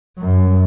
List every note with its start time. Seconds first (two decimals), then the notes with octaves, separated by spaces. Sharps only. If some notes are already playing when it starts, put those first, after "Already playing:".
0.18 F#2